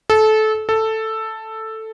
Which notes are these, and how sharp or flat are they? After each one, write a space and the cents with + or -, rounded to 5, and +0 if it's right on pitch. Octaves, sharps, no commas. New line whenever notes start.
A4 -20
A4 +5